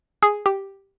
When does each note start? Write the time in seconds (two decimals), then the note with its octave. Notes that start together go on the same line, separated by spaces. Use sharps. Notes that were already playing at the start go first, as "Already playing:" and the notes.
0.23 G#4
0.46 G4